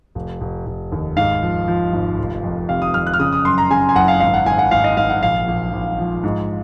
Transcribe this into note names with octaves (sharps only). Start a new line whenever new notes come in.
F1
F1
F1
D#2
G#2 F5
F3
F3
G#1
F1
F2
C3 F5
D#6
F2 F6
F#6
F6
C#3 D#6
D#6
F#2 C6
A#5
C#3 G#5
G#5
F#1 F#5
F5
G#1 F5
F#5
G#1 G#5
F#5
G#1 F5
D#5
G#1 F5
F#5
A#1 F5
A#1
A#1
F3
G#2